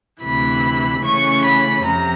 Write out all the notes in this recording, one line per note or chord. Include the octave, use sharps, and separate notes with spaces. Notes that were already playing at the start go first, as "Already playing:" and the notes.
D2 C3 E3 B5
C#3 E3 A3 C#4 C#6
B5
F2 C3 F3 A#5